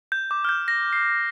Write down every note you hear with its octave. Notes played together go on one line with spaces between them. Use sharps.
G6
D6
F6
G6
A#6
C7